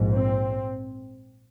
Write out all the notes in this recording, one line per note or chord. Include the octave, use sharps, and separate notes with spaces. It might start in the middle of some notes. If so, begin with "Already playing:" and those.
Already playing: A#1 G#2
C4